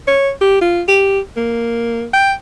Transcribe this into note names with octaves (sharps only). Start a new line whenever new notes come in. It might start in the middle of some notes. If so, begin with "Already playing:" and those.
C#5
G4
F4
G4
A#3
G5